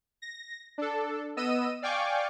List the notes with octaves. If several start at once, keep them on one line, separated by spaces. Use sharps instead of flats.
A#6
D4 A4
B3 D#5 E6 D#7
D5 F5 G5 G#5 C#6 D6